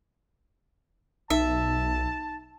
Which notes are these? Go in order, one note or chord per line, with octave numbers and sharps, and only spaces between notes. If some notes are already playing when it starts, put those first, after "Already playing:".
B1 D#4 E5 A5